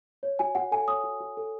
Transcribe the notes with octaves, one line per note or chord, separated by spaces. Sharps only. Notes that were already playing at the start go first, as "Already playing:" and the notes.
C#5
F#4 G#5
F#4 F#5
A4 G#5
C#5 D#6
F#4
F#4
A4